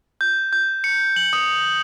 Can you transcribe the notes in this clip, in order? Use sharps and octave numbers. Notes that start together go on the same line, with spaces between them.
G6
G6
C#7
F#7
D#6